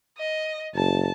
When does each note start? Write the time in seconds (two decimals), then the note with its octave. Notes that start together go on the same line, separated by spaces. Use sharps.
0.18 D#5
0.75 F#1 A5